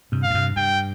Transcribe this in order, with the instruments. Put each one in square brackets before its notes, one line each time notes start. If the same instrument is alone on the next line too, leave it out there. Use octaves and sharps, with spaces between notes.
[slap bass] G2 C3
[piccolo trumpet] F5
[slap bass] A2
G2 C3
[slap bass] G2 [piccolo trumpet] G5